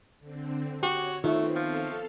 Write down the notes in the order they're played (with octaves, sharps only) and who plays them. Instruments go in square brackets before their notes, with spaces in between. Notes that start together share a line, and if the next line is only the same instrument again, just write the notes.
[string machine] D3 C4
[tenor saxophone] F#4 [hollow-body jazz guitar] G4 [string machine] C#5
[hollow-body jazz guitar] D#3 [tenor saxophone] A3 [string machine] B3 C4 [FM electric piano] F4 E5 C#6
[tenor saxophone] F3 [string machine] A4 F5